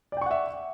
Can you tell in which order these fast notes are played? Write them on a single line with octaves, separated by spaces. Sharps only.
D5 G5 C#6 F#5 E5